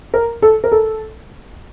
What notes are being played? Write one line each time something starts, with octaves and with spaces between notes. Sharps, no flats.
A#4
A4
A#4
A4